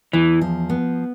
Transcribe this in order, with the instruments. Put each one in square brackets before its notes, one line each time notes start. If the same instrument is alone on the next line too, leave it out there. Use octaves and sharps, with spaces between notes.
[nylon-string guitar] E2 [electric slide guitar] E3
[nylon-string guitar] F3
B3